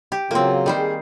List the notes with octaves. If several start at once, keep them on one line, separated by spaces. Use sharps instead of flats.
G4
C#3 F#3 A#3 C4 F4
D#3 G3 C5
G#4